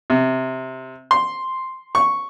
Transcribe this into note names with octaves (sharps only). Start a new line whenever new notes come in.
C3
C6
C#6